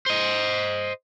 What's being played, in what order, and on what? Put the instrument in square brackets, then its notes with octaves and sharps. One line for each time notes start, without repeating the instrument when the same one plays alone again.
[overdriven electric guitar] C5 D#5